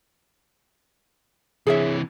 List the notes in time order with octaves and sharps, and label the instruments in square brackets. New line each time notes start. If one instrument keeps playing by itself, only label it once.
[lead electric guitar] C3 E3 [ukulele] G#4 C#5 E5